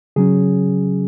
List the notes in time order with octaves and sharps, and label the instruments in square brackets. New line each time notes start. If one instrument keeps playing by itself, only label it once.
[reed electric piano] C#3 F#3 C#4 G#4